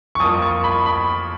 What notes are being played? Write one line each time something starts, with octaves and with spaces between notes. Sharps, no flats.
C#6
F2 F3 A#3 D#6
C#6
B5
B5